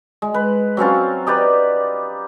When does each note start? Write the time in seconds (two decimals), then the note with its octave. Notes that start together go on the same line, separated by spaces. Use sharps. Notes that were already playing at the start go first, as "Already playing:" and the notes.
0.22 G#3
0.34 B4
0.77 F#3 C4 C#4 F4
1.26 D#4 G4 B4 D5